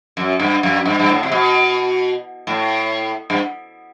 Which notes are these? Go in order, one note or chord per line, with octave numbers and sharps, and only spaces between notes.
F#2
G2
F#2
G2
G2
A2
C3
B2
A2
G2